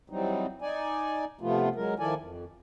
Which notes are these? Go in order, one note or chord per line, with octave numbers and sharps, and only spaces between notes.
E3 F#3 G3 C4 D#4
D#4 D5 G#5
C3 F3 A3 B3 F4
F#3 G#3 A#4
D#3 F3 E4 A4 D5 G#5
F2